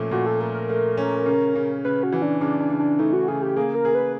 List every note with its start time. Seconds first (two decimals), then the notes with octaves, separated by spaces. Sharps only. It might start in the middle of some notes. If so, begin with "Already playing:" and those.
Already playing: A#2 F3 A3 C#4
0.11 A#2 F#4
0.26 A4
0.40 A3 A#4
0.54 A#4
0.69 A3
0.97 C#4
1.26 C#3
1.56 C#3
1.85 C#3 B4
2.03 F#4
2.13 E3
2.22 D4
2.41 C#3 D4
2.60 D4
2.70 C#3
2.79 D4
2.99 A3 D#4
3.13 F#4
3.28 C#3 G#4
3.42 G4
3.56 A#3 G#4
3.75 A#4
3.85 G#4
3.95 B4